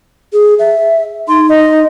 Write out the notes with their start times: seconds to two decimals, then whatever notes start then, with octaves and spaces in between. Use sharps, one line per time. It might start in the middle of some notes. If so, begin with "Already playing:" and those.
0.33 G#4
0.59 E5
1.28 D#4 C6
1.49 D#5